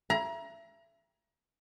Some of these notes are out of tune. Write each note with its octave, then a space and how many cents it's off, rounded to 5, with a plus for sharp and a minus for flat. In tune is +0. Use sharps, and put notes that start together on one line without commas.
E4 +30 A#5 +30